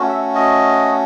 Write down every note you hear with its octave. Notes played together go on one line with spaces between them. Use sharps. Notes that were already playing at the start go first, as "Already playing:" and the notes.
Already playing: A3 C#4 F#4
E5
D#5